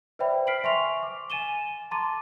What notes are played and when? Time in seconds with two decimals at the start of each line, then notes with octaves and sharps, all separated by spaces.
0.19 B4 C5 D5 E5 G5 B5
0.47 F6 B6 C7 D7 F#7
0.64 E5 G#5 C6 C#6 F7
1.03 D6
1.30 G#5 A6 D#7 E7 G7
1.91 A5 A#5 C6 D6 A6 D#7